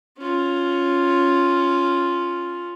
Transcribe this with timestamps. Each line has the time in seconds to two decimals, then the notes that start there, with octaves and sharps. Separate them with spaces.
0.17 C#4 F4